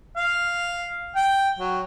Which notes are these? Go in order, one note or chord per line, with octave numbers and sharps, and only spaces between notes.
F5
G5
F#3